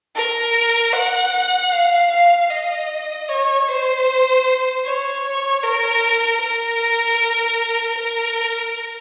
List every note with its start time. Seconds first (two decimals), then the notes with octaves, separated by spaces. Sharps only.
0.15 A#4
0.93 F#5
1.72 F5
2.11 F5
2.50 D#5
3.28 C#5
3.68 C5
4.85 C#5
5.63 A#4
6.41 A#4
7.98 A#4